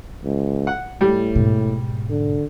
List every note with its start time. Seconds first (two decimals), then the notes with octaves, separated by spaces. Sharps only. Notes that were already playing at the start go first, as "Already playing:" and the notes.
0.25 C#2
0.67 F#5
1.01 A2 G3
1.35 G#2 B2
2.10 D3